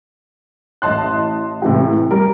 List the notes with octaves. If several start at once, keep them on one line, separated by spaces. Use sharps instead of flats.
A1 E4 D#5 A5 C6 F#6
A2 C3 E3 G#3 E4 G4
G3 A#4